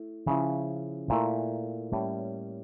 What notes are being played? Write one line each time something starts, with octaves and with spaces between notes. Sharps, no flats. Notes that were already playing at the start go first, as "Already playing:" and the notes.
Already playing: A3 E4
C#3 F3 C#4 E4
A#2 A3 E4 A#4
A2 G3 A#3 C#4